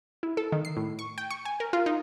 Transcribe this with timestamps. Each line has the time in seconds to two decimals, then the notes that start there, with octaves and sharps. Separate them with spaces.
0.23 E4
0.37 A4
0.52 D#3
0.65 C7
0.77 A2
0.99 C#6
1.18 G5
1.30 C#6
1.45 G#5
1.60 A#4
1.73 F4
1.86 D#4